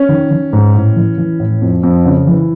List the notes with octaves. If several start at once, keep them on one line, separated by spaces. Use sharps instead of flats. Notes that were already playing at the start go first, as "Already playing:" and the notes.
Already playing: C#4
D#3
D#3
G#2
A2
E3
E3
A2
F2
F2
C#3
E3